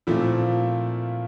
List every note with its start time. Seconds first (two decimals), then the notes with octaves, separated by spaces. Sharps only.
0.07 A#2 F3 A3 C4 E4